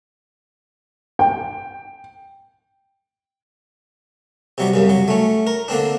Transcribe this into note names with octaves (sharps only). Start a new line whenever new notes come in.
G5
C3 F#3 G3
C2 F#2 C#3
F#3
A3 C#4
A#4
D3 A#3 C4 D4